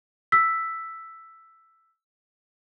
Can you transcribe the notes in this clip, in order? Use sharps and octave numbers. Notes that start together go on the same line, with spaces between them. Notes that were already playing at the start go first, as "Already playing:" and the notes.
E6 B6